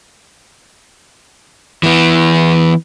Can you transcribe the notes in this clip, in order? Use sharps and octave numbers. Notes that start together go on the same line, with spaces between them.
E3 B3